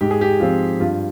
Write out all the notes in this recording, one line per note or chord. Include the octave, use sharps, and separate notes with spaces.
G#2 G4
G#4
G4
F3 C4 F4
G2 F4